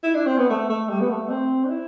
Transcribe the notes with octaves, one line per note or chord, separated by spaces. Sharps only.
E4
D4
C4
B3
A3
A3
G3
B3
A3
C4
D4
E4